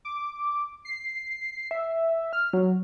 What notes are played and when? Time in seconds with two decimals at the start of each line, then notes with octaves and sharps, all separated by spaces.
0.05 D6
0.85 C7
1.71 E5
2.33 F6
2.53 F#3